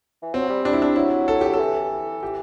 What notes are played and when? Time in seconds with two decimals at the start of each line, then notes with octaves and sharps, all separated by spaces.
0.22 E3
0.34 F#3 C4
0.49 G3
0.65 G3 D4
0.73 E4
0.82 D4
0.96 F#3 E4
1.28 A4
1.41 G4
1.49 F#3 A4
1.59 E3
2.23 G4